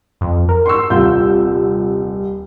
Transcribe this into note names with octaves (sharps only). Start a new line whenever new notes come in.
F2
A#4
C6 C#6 E6
D#1 C2 F4 G6